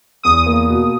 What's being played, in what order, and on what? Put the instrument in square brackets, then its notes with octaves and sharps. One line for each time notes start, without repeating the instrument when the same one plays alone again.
[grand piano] E2 [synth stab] D#6
[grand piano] A#3
B2